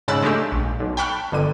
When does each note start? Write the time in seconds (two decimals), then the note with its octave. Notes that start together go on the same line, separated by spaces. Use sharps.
0.08 G#2 C#3 A5 B5 E6 F#6
0.23 G#3 A3 D4 G4
0.52 A#1
0.80 B1
0.97 G5 A5 B5 C#6 F6 F#6
1.32 G1 D3 D#7